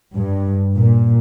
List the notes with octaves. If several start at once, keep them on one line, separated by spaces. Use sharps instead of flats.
G2
A#2